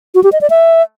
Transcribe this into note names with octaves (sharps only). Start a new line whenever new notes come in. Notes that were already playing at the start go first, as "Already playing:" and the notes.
F#4
G4
D#5
D5
E5